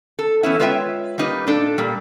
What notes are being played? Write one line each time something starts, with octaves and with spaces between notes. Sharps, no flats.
A4
E3 B3 C#4 E4
G#3 F4 B4 C#5 E5 G5
G3 A#3 D#4 B4
A#2 D4 A4
A#2 G3